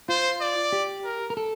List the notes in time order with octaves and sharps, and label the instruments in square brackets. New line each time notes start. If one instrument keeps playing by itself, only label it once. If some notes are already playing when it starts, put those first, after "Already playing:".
[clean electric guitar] F4 [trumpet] C5
[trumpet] D5
[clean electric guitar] G4
[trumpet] A#4
[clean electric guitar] A#4
A4